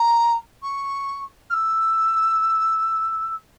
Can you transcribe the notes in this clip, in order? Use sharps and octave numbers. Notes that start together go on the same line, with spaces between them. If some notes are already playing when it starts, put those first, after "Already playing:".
Already playing: A#5
C#6
F6
E6